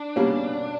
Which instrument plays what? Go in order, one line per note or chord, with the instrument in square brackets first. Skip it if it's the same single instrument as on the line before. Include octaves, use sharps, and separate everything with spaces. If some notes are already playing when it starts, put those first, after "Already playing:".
Already playing: [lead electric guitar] D4
[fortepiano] B2 G3 A#3 C#4